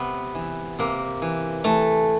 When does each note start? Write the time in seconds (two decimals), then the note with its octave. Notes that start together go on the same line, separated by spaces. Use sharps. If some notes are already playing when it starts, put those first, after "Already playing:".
Already playing: C3 B3
0.35 E3
0.79 C3 A#3
1.22 E3
1.64 E3 A3